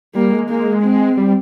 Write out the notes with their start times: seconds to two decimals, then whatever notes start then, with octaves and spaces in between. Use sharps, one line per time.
0.15 G3 A#3
0.32 G#3
0.49 A#3
0.83 C4
1.17 G3